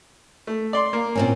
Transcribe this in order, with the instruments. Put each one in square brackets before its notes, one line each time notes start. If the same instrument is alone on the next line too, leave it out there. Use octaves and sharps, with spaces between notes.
[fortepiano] A3
D5 C6
A#3
[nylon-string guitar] A#2 C4 C#4